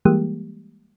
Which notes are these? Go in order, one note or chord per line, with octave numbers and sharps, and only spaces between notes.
E3 G3 G#3 A#3 G4